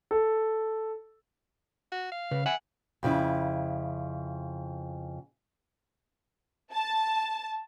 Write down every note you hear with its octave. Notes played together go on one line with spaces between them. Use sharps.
A4
F#4
F5
C#3 B4
E5 F#5 G#5
F2 C#3 E4
A5